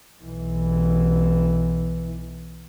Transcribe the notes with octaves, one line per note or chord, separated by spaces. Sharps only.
B1 E3